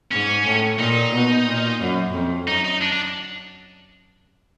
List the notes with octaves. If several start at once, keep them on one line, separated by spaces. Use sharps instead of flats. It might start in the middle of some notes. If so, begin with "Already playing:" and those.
G#2 C#4
A2
A#2 D#4
B2
A#2
F#2
F2
F#2 D#4
D#4
D4
D4